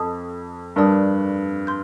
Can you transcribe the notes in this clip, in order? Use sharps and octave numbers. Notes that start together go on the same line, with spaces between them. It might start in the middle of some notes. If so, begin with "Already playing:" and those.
Already playing: F2 A4 D#5 A5 D#6
G2 A#4 D5 A5 D#6
C6 G6